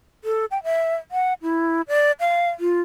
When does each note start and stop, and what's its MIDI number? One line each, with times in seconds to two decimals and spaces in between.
0.24 0.45 69
0.51 0.62 79
0.64 0.95 76
1.11 1.33 78
1.42 1.81 64
1.88 2.12 74
2.20 2.50 77
2.60 2.81 65